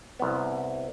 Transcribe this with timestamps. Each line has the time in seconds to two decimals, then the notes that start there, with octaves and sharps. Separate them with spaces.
0.19 C2 B3